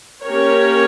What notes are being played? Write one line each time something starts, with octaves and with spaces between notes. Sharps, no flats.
A#3 C#4 G4 A#4 C#5